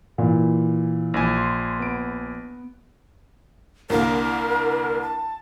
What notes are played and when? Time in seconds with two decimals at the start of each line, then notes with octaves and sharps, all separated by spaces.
0.18 A#2 E3
1.14 A#1 G#5
1.37 C6
1.79 B3 D7
3.90 C2 D3 A#3 A#4
5.02 A5